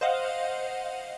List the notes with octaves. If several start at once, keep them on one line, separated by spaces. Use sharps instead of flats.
C5 D#5 F5 F#5